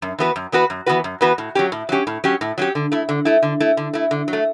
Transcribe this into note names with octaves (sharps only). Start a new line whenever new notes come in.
F#2
E3 B3 F#4 B4
F#2
E3 B3 F#4 B4
F#2
E3 B3 F#4 B4
F#2
E3 B3 F#4 B4
A2
F#3 C#4 G4
A2
F#3 C#4 G4
A2
F#3 C#4 G4
A2
F#3 C#4 G4
D3
A3 E4
D3
A3 E4
D3
A3 E4
D3
A3 E4
D3
F#3
A3